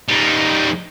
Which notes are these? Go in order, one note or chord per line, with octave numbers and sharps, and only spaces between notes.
G3 D#4